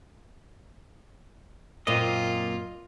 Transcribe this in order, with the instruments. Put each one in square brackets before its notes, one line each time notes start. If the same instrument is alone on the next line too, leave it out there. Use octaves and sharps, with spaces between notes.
[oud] F#2 A#2 C4 [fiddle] F4 [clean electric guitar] D#5